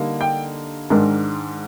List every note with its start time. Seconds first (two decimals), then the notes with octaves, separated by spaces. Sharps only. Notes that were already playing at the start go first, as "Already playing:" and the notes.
Already playing: D3 G3 A#3 D#4
0.21 G5
0.90 G#2 D#3 G#3 D4 A#4